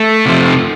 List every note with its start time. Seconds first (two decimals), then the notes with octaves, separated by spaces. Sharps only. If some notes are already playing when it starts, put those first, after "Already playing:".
Already playing: A3
0.26 C3 F3